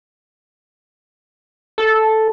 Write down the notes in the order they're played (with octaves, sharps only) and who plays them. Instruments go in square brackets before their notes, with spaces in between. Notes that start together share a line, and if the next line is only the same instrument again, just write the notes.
[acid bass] A4